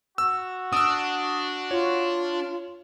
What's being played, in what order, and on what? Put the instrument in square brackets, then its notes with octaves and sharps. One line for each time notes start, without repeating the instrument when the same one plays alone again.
[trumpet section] F#4 [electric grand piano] E6
[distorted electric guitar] D4 [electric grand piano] D#6 E6
[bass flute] F4 [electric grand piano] C#5